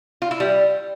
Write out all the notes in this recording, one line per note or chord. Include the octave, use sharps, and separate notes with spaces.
F4
E4
G3